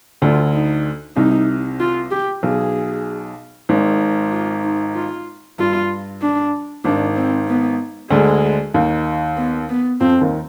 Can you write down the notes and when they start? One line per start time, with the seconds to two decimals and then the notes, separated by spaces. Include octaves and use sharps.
0.22 D2 D3 F4
0.53 D#4
1.16 C2 C3 D#4
1.80 F4
2.11 G4
2.43 B1 B2 G#4
3.69 G#1 G#2
4.32 F4
4.64 D#4
4.95 F4
5.59 G2 F4
6.22 D4
6.84 G#1 G#2 D4
7.16 C4
7.48 B3
8.11 D2 D3 G#3
8.74 D#2 D#3
9.37 B3
9.69 B3
10.00 F2 F3 C4
10.21 D#2 D#3